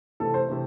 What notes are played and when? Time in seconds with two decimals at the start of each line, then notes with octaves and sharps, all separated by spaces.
0.20 C3 E3 A3 A4
0.34 C5
0.48 C3 E3 A3